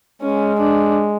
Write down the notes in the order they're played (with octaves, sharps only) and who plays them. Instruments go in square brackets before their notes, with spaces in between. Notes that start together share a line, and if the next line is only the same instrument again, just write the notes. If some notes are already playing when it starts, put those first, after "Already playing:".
[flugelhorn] G#3 [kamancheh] C#4
[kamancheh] D4